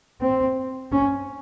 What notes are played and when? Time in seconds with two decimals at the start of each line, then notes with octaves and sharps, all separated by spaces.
0.21 C4
0.92 C#4